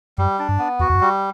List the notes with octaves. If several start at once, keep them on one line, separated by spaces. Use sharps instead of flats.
F#2 G3
D4
G2
B3
E2 F#4
E2
F#2
G3